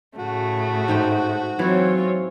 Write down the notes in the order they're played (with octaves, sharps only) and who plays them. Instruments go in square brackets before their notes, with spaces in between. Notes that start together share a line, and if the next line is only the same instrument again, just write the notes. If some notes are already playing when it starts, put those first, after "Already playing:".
[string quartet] A2 C#3 A3 [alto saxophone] F#4
[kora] G#2 D#4 G5
[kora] E3 E4 [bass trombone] F#3 [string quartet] C4 F4 C#5